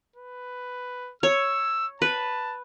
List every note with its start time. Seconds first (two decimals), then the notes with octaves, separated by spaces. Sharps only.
0.16 B4
1.23 C#5 E6
2.02 B4 A5